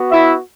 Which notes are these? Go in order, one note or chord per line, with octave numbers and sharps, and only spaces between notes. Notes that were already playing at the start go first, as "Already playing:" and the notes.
Already playing: B3 F#4
E4 E5